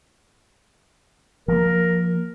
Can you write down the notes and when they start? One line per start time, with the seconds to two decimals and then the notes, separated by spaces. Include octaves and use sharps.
1.48 F3 A#3 A#4